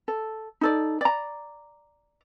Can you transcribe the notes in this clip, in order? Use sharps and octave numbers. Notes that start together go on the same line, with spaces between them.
A4
D#4 A4 D5
D5 A#5